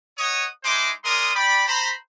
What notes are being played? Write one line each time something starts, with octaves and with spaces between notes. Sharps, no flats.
C#5 D#5 F#5 D#6
G#3 D#4 E4 C5 C6 D6
G#3 A#4 D5 C6 D#6
D5 G5 B5
C5 A#5 B5